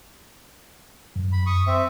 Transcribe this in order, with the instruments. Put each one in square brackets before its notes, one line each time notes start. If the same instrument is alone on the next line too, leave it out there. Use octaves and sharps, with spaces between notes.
[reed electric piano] F#2
[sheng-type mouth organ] B5
C#6 D#6
C4 E5